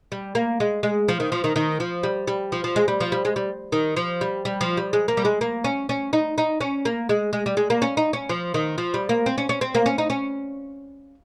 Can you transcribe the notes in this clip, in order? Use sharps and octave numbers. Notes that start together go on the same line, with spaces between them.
G3
A#3
G#3
G#3
F3
D#3
F3
D#3
D#3
F3
G3
G3
F3
F3
G#3
G3
F3
G3
G#3
G3
D#3
F3
G3
G3
F3
G3
G#3
A#3
G3
G#3
A#3
C#4
C#4
D#4
D#4
C#4
A#3
G#3
G#3
G3
G#3
A#3
C#4
D#4
C#4
F3
D#3
F3
G3
A#3
C4
C#4
C#4
C4
A#3
C#4
D#4
C#4